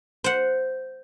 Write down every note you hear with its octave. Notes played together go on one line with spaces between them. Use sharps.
C5 F#5